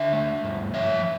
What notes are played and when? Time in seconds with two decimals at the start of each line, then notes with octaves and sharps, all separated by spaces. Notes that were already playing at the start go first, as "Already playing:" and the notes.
Already playing: D3 C#5 E5
0.13 A3
0.44 G2
0.74 F3 C#5 E5